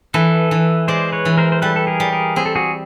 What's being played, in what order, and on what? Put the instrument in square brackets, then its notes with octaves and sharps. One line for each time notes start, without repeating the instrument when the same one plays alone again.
[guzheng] E3 [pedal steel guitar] A4 B4
[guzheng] E3
[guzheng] G#3 [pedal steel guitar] C5 D5
[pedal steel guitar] B4 C#5
[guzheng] E3
[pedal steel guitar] A#4 C5
C5
[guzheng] G3 [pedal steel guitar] A4 B4
[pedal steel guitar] A4
G#4 A#4
[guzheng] G3
[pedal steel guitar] G#4 A#4
[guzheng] C4 [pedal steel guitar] G#4
[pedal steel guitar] A4
F#4 G#4